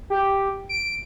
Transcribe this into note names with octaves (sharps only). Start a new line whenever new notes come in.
G4
D7